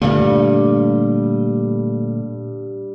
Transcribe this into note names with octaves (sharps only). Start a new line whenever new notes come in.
G2 A#2 D3 A3 F5